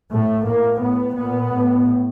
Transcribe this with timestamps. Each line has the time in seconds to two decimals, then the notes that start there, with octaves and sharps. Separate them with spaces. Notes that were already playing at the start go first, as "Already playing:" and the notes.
0.12 A2 A3
0.47 A2 A#3
0.82 A2 B3
1.17 A#2 B3
1.53 A2